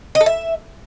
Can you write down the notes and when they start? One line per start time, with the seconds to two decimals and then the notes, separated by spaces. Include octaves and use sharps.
0.15 D#5
0.21 A4
0.26 E5